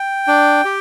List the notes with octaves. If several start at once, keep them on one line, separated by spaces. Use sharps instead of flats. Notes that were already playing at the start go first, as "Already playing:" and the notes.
Already playing: G5
D4
G4